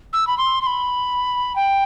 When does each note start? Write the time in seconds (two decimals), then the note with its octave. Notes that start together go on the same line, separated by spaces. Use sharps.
0.13 E6
0.27 B5
0.38 C6
0.62 C6
0.67 B5
1.56 G5